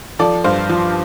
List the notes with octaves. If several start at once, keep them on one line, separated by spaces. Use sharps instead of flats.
F3 A4 D5
G2 C5 F5
F3